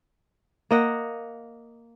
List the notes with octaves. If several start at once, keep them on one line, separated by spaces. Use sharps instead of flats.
A#3 D#5 F#5